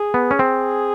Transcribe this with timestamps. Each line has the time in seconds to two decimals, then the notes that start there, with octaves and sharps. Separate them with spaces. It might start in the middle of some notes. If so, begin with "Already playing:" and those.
Already playing: G#4
0.14 B3
0.31 C#4
0.39 C4